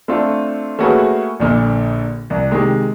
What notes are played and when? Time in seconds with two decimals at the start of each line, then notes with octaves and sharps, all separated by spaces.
0.08 A3 C4 D4 F4
0.79 A3 A#3 C#4 F#4 G#4 B4
1.40 A#1 A#2 D3
2.30 C2
2.52 C3 D#3 G#3